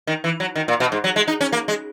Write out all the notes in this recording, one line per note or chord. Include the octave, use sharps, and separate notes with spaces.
D#3
E3
F#3
D#3
A#2
B2
G#2
F#3
G#3
D#4
C#4
A#3
G#3